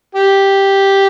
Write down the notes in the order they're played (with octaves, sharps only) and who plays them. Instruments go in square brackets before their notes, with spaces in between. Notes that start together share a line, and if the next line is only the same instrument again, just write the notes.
[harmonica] G4